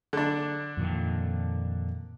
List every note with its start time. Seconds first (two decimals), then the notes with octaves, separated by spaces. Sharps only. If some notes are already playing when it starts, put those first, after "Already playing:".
0.13 D3 D4
0.77 F2 A#2 D#3